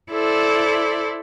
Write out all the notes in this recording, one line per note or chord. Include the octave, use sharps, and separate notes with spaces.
E4 A4 C5 D5